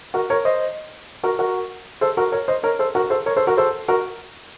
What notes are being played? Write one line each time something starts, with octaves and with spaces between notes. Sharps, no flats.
F#4 A#4
A#4 C#5
C5 D#5
F#4 A#4
F#4 A#4
A4 C5
F#4 A#4
A#4 C#5
C5 D#5
A#4 C#5
A4 C5
F#4 A#4
A4 C5
A#4 C#5
A4 C5
F#4 A#4
A4 C5
F#4 A#4